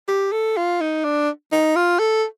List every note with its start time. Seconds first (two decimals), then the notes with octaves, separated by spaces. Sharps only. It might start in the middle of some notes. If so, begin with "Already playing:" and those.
0.08 G4
0.32 A4
0.57 F4
0.81 D#4
1.04 D4
1.52 D#4
1.76 F4
1.99 A4